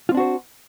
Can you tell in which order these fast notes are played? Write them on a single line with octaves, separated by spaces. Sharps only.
F4 C4 D4 F#4 C5